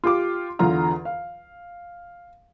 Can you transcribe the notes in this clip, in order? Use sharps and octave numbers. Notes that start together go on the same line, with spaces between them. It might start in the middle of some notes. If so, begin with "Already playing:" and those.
F4 G4 D6
E2 D3 F4 A#5 F6
F5